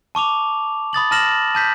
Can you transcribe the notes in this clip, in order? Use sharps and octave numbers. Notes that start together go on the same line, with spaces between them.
A5 C#6 D6 F7
B5 D#6 A6 F#7
A5 B5 F6 A#6 E7 F#7
A5 G6 B6